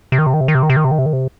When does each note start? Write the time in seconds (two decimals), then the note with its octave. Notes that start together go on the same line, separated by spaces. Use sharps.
0.12 C3
0.19 D#3
0.27 C3
0.34 D#3
0.41 C3
0.48 D#3
0.55 C3
0.63 D#3
0.70 C3
0.77 D#3
0.85 C3
0.91 D#3
0.99 C3
1.06 D#3
1.13 C3